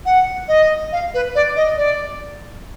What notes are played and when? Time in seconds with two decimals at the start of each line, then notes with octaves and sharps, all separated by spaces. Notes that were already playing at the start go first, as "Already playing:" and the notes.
0.06 F#5
0.48 D#5
0.92 F5
1.14 B4
1.35 D5
1.56 D#5
1.78 D5